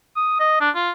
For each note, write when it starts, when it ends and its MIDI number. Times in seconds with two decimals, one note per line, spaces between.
0.16 0.35 87
0.40 0.60 75
0.61 0.70 62
0.75 0.91 65